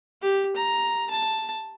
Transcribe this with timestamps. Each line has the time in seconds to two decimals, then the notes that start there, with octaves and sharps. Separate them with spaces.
0.22 G4
0.57 A#5
1.11 A5